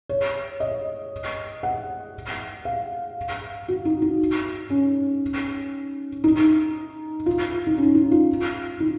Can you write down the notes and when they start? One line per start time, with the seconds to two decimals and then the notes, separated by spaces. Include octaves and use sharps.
0.09 C#5
0.60 D#5
1.63 F#5
2.65 F5
3.68 F#4
3.85 D#4
4.02 D#4
4.70 C#4
6.24 D#4
7.26 F4
7.67 D#4
7.78 C#4
7.95 D#4
8.11 F4
8.80 D#4